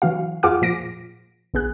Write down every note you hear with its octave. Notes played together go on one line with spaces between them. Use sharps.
E3 F#3 F#4 F5
F2 F4 G#4 F#5 D6 F6
A#2 F3 A#6 D7
A#1 B3 G#4 F#6